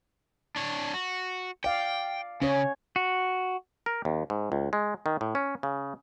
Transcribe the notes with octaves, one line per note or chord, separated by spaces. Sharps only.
D4 C#5
F#4
D5 F5 G5
C#3 C#4 C#5
F#4
A#4
D#2
G#2
C#2
G#3
D#3
A2
C#4
C#3